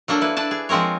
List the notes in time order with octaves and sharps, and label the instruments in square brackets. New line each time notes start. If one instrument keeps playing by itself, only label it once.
[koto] F#3 A#3 D4 A4
E4 B4
D4 B4 A5
G#4
F3 G#3 C4 A#4 C#5